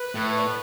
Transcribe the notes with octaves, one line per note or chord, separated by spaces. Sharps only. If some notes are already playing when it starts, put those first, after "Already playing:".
Already playing: B4
A2
D5
B4